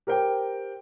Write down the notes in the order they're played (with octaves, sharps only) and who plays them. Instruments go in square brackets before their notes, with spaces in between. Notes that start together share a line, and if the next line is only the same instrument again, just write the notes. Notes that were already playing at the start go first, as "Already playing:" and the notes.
[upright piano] G4 A#4 C5 G5